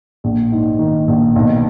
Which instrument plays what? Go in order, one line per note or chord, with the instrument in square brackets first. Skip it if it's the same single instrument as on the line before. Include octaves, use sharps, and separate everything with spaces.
[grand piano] A#1
G#2
D#3
A#1
B1